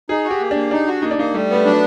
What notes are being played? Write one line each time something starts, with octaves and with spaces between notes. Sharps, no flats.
D#4 G#4
F#4
G4
A#3
A#3 D4
D4 D#4
F#4
A#3 D#4
D4
A#3 D#4
G3 A3
A3 B3
F#3 D4